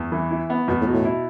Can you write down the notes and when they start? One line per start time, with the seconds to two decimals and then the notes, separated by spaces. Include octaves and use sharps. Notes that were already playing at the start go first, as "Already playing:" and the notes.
Already playing: E2
0.12 E3
0.31 E4
0.50 B3
0.68 E2 B2
0.81 A2
0.87 B2
0.93 A2
1.05 E4